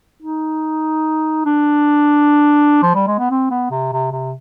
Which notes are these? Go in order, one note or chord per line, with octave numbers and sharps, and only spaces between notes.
D#4
D4
F3
G3
G#3
B3
C4
B3
C3
C3
C3